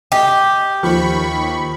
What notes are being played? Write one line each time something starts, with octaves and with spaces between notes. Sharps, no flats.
G4 D#5
D#2 F3 B5 C#6